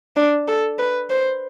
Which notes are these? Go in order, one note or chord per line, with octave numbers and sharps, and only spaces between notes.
D4
A4
B4
C5